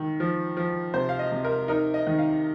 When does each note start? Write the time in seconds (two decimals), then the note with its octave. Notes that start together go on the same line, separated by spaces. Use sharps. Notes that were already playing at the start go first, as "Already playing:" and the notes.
Already playing: D#3
0.20 F3
0.57 F3
0.94 C3 C5
1.09 F5
1.19 D#5
1.32 C3
1.45 A#4
1.68 D#4 A#4
1.94 D#5
2.07 D#3
2.18 F5